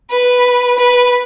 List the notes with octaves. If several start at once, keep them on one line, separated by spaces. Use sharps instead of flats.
B4
B4